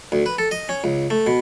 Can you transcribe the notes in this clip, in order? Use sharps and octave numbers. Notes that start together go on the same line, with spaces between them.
D2
B4
A4
D#5
C#4
C#2
A3
B2